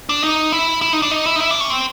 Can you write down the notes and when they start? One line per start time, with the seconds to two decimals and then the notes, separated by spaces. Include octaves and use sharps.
0.09 D4
0.24 D#4
0.52 E4
0.82 E4
0.93 D#4
1.02 D4
1.11 D#4
1.26 E4
1.36 D#4
1.40 E4
1.51 D4
1.60 C#4
1.70 C4